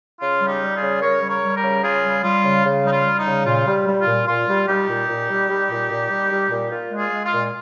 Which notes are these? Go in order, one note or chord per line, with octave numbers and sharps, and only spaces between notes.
C#3 F4
G3
D#4 G4
G3
F4 G#4
C#3
C#3 A#4 C#5
G3
A#4 C#5
G3
G4 A#4
C#3
C#3 F4 G#4
G3
G3 F4
C#3
C#3
G3 D#4
F4
G3
D#4
C#3
A#2 F4
G3
G3
F4
A#2
A#2 F4
G3
G3 D#4 G4
A#2
A#2
G3
G3
A#2
A#2
G3
G3
A#2
A#2 F4
G#3
F4 G#4
G#3
F4
A#2